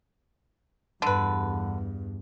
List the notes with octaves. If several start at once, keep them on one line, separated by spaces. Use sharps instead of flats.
E2 G2 D3 B4